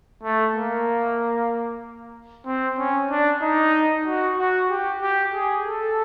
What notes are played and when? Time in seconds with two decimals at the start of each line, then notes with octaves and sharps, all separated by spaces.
0.23 A3
0.54 A#3
2.46 C4
2.78 C#4
3.10 D4
3.41 D#4
4.06 F#4
4.38 F#4
4.70 G4
5.02 G4
5.34 G#4
5.65 A4